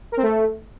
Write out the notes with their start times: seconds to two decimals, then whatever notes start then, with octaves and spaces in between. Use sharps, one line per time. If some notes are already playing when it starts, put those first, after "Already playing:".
0.12 A#4
0.17 C4
0.23 A3